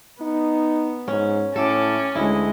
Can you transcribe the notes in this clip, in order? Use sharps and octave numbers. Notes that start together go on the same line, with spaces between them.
B3 D#4
G#2 C#4
A2 C#4 A4 A5 D6
D2 G#3 E4 D#5